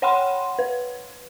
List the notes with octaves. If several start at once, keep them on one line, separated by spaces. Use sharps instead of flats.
C#5 F#5 G5 B5 C6
B4